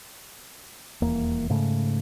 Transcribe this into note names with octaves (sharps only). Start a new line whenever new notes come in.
D#1 E2 A#3
G#2 C#3 A3